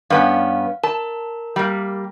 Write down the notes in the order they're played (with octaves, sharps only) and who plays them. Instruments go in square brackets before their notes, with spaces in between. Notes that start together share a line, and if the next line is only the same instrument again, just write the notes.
[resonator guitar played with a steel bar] G2 B3 C#4 [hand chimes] F5
[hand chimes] A#4 [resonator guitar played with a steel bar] A5
[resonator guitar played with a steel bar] G3 A#3